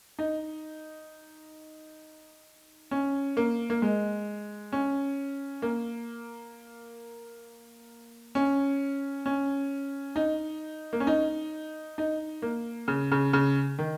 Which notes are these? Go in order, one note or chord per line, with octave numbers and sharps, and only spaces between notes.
D#4
C#4
A#3
A#3
G#3
C#4
A#3
C#4
C#4
D#4
A#3
C#4
D#4
D#4
A#3
C#3
C#3
C#3
D#3